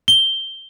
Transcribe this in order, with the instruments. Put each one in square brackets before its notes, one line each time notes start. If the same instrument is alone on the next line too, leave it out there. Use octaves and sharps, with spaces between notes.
[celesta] G7